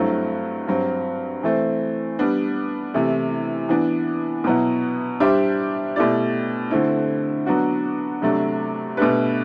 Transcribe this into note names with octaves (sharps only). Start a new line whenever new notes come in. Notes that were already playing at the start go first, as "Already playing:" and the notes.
Already playing: G2 F#3 A3 C4 E4
G2 F#3 C4
E3 A3 C4
G3 B3 D4
C3 E3 A3 E4
E3 B3 D4
B2 F#3 B3 E4
G3 D4 G4 C5 E5
B2 A3 E4 G4 D5
D3 A3 C4 E4
F#3 B3 D4 F#4
C3 F#3 A3 D4
B2 A3 D4 G4 B4